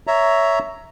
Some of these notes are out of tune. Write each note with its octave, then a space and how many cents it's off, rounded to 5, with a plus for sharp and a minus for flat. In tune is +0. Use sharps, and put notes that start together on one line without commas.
C#5 +10 E5 +0 A#5 +0